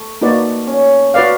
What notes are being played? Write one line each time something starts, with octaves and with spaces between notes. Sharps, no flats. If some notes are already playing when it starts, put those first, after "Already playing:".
Already playing: A3
A#3 D#4 F#4 B4 D5
C#4
F#4 B4 D5 F5